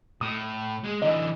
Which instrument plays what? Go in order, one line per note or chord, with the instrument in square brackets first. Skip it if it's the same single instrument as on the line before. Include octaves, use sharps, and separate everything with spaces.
[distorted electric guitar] A2 [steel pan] D#6
[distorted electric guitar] G#3
[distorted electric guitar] D3 E3 [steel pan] D#5